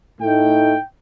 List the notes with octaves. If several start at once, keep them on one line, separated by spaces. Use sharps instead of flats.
A2 A3 D#4 G5